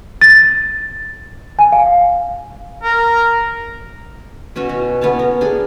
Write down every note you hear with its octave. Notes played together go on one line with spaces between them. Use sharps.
A6
G#5
F5
A#4
B2 C#4 F#4 C#5
F#4
B3 C#4 C#5 A5
A#4
D4 G#4 A4